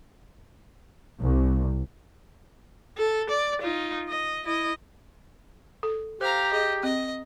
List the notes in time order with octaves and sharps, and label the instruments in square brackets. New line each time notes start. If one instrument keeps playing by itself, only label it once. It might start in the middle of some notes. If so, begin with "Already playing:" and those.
[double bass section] C2
[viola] A4
D5
D#4 F4
D#5
E4 D#5
[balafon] A4
[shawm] G4 [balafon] C5 [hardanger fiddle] F5 A#5
[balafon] G#4 [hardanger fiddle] D#5
[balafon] C4 [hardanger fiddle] D#5